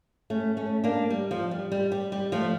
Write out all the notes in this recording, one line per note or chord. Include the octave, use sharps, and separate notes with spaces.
A3 C#4
A3 C#4
A#3 D4
G3
F3
G3
G3
G3
G3
F3 A3